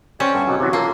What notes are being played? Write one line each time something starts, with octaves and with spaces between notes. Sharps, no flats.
C#4 G4 C5 D5
G2 B3 A4 A5
C3 F#3 D#4
C3 E3 F#3 F#4
A#3 F4 A4 C6